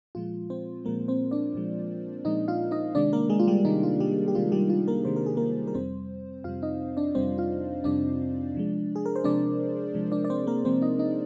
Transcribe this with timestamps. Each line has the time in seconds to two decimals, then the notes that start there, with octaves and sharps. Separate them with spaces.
0.15 A#2 F3 G#3 F4
0.50 C4 C5
0.85 A#2 F3 G#3 A#3 A#4
1.08 C4 C5
1.31 D4 D5
1.55 A#2 F3 G#3
2.25 A#2 F3 G#3 D#4 D#5
2.48 F4 F5
2.71 D#4 D#5
2.95 C3 D#3 G#3 D4 D5
3.13 A#3 A#4
3.30 G#3 G#4
3.40 F4
3.47 G3 G4
3.64 C3 D#3 G#3 D#4
3.83 F4
4.00 G3 G4
4.28 G4
4.35 C3 D#3 G#3 F4
4.52 G3 G4
4.70 F4
4.88 A#3 A#4
5.05 C3 D#3 G#3 C5
5.16 A#4
5.26 G#4
5.37 A#3 A#4
5.67 A#4
5.74 F2 C3 G3 C4 C5
6.44 F2 C3 G3 F4 F5
6.62 D#4 D#5
6.97 D4 D5
7.15 F2 C3 G3 C4 C5
7.38 F4 F5
7.84 F2 C3 G3 D4 D5
8.55 C3 F3 G#3
8.96 G#4
9.06 A#4
9.16 C5
9.24 C3 F3 G#3 D4 D5
9.94 C3 F3 G#3
10.12 D4 D5
10.24 D5
10.30 C4 C5
10.47 A#3 A#4
10.65 C3 F3 G#3 C4 C5
10.82 D#4 D#5
10.99 D#4 D#5